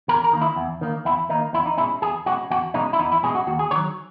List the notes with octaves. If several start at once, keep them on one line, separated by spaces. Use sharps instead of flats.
E2 A#4
A#4
D#3 A#3
E4
E2
D#3 A#3
E2 E4
D#3 A#3 D#4
E2 E4
D#4
B2 G#3 C#4 E4
E2 G#4
B2 G#3 C#4 F#4
E2 F#4
B2 G#3 C#4 D#4
E4
E2 D#4
E4
B2 G#3 C#4 G#4
F#4
D#2 F#4
G#4
D#3 F#3 C#5